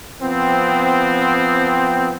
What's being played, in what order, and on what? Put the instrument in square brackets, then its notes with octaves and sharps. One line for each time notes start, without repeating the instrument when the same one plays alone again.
[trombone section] F3 B3 C4